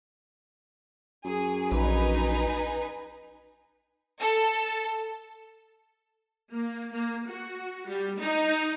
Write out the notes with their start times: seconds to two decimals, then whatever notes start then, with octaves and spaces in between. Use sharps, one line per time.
1.25 F#2 G#4
1.72 A#1 D#4 B4 G#5
4.21 A4
6.51 A#3
6.92 A#3
7.27 F#4
7.88 G3
8.19 D#4